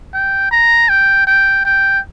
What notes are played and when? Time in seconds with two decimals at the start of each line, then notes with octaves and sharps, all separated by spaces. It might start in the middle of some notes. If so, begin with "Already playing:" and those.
0.14 G5
0.52 A#5
0.89 G5
1.27 G5
1.65 G5